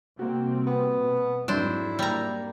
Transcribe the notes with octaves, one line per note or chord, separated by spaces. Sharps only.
C3 G3 A#3 C4 F#4
B3
B2
F2 G#2 F#3 D4 E4 C5
G3 A#3 A#5